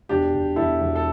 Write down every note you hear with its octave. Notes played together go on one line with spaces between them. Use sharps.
E1 D4 G4
E1
E1 E4 A4
E1
A4